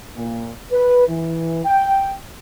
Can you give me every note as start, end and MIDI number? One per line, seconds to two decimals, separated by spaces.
0.16 0.50 46
0.72 1.08 71
1.08 1.60 52
1.65 2.12 79